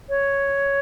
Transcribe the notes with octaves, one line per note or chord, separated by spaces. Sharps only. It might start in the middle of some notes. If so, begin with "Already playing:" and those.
C#5